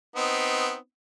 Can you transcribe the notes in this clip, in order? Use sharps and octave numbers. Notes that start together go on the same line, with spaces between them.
B3 C4 D#4